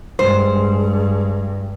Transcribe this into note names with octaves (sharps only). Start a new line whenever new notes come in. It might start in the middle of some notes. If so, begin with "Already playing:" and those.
G2 G#3 C5